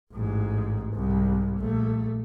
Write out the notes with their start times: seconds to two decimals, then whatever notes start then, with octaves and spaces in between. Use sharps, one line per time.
0.13 A1 G#2
0.94 C2 G#2
1.59 A#1 A3